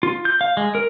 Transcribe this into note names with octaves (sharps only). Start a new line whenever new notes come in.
F4
G6
F5
G#3
A#4